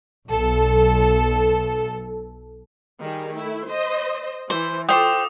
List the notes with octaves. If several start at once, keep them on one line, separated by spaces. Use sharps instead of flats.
B1 A4
D#3 G3 G#4
A3 E4
C5 D#5
E3 C5
F4 A4 C5 G5 D6 D#6